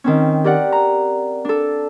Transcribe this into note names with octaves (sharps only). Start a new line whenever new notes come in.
D#3 C4 C#4
G4 A#4 D5 F#5
A#5
D4 A4